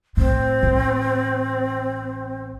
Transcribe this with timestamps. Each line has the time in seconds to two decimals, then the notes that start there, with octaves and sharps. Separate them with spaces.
0.17 A2 C4
0.63 A1